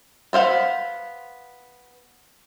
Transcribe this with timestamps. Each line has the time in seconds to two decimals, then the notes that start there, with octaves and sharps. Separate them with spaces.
0.33 B3 C5 F5 F#5